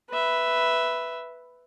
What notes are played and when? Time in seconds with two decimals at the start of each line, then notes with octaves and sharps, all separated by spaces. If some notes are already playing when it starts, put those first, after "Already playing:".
0.10 B4 E5